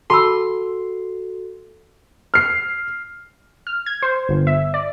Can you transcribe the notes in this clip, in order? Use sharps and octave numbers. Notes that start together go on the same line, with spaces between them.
F#4 A4 A5 B5 C6 E6
F6 C7
F6
G#6
C5
G1
E5
D5